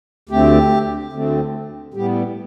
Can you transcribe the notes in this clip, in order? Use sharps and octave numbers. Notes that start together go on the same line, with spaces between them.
D2 D3 A3 C4 G4
D2 D3 A3 C4
A2 G3 B3 G4